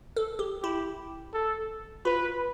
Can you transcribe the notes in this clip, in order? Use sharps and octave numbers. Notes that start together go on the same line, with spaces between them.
A4
G4
E4 G4
A4
F4 B4